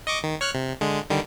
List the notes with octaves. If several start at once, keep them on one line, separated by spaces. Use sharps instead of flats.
D#5 C#6 D6
D#3
C#5 F6 F#6
C3
D3 G#3
D3 D#3 G3